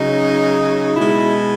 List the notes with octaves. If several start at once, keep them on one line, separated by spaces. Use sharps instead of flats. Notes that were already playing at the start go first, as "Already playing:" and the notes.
Already playing: C#3 F#3 D#4
B2 G#3 E4